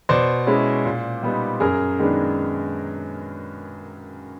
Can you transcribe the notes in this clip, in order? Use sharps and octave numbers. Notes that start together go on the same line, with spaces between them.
B2 C5 D5
G#3 C#4 E4
A#2
G3 B3 D#4
F#2 G#4 A#4
D#3 G#3 B3 D4